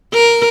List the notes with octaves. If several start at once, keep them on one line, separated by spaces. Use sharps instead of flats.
A#4